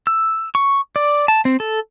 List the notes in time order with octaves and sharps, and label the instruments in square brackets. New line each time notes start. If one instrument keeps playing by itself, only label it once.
[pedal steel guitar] E6
C#6
D5
A5
C4
A4